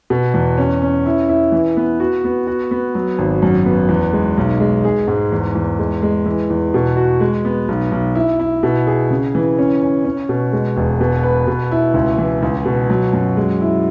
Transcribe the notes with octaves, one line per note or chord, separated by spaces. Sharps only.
B2
E2
C#4
C#4
E4
E4
E3
B3
F#4
B3
F#4
B3
F#3
G#1
F#2
B3
E2
G#3
B1
G#3
G#4
G#2
E2
E2
G#3
G#3
E3
E2
B2
F#4
G#3
B3
B1
B1
E4
E4
B2
G#4
C#3
E3
C#4
C#4
C#4
B2
G#3
E1
B2
B4
B2
E4
C#2
E3
C#2
B2
F#3
F#2
G#3
E4